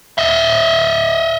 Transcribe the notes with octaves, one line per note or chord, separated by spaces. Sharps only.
D#5 E5